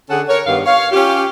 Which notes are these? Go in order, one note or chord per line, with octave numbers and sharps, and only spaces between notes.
D3 C#4 G#4 A4 F#5
A#4 C#5
G2 D#3 B3 F5
C#5 F5
C#4 F4 G4